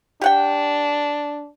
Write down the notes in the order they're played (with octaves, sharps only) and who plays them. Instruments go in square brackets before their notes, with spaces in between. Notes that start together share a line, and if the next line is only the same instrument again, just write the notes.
[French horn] D4 [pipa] G4 F#5 G5